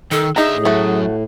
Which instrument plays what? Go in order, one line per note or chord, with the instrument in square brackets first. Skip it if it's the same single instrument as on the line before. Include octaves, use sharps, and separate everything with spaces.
[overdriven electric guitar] D#3 [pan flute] A4
[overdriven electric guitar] D3 E5 [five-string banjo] D#4 A#5 [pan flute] G#4
[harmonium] A2
[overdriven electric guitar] F#2 [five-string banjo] A3 F#4